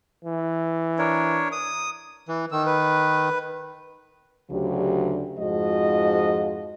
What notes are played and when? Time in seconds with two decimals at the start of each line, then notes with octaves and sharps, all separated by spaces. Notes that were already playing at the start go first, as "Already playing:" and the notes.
0.25 E3
0.98 D4 A#4 C#5
1.52 D#6
2.28 E3
2.51 D#3 E6
2.66 B4
4.50 D2 C#3 F#3 D4 G4
5.39 F2 G#2 F3 G#3 F#4 D#5